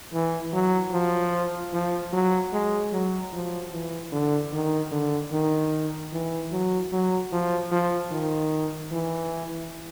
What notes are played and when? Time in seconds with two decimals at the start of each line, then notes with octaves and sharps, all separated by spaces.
0.13 E3
0.53 F#3
0.92 F3
1.73 F3
2.13 F#3
2.52 G#3
2.92 F#3
3.32 F3
3.72 E3
4.12 D3
4.53 D#3
4.92 D3
5.33 D#3
6.13 E3
6.52 F#3
6.92 F#3
7.32 F3
7.71 F3
8.11 D#3
8.91 E3